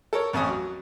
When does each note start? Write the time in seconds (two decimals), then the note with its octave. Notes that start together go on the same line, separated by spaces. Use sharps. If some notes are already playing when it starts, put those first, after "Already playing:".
0.13 A4 A#4 C#5
0.33 A1 F2 A3 C#4 G#5 D#6
0.47 F#3